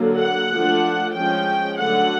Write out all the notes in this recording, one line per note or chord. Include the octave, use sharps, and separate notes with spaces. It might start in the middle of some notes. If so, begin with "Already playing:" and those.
Already playing: D3 F#3 A#3
F#5
F3 A3 D4
F3 G#3 C#4 G5
D3 F#3 A3 F#5